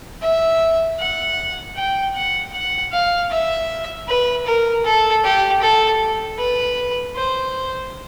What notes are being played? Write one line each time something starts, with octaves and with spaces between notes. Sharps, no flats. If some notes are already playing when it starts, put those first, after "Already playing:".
E5
F#5
G5
F#5
F#5
F5
E5
B4
A#4
A4
G4
A4
B4
C5